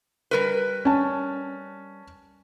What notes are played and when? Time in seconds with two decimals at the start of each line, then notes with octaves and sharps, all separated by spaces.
0.31 G3 A#4 B4
0.85 C#4 A5